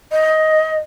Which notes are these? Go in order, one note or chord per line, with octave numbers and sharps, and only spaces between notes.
D#5